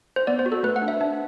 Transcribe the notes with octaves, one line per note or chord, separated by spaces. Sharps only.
C5
B3 D5
C5
F#4
A4
A3 B4
F#5
D4
E5
D4